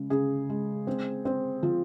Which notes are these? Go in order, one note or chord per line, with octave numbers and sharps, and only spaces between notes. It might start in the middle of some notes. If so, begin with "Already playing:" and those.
Already playing: C#3 G#3
C#3 G#4
G#3
C4
C4
F3